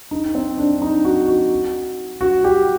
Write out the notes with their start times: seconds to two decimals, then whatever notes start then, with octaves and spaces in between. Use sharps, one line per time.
0.11 D#4
0.35 C4
0.58 D4
0.82 D#4
1.04 F#4
1.28 F#4
2.21 F#4
2.44 G4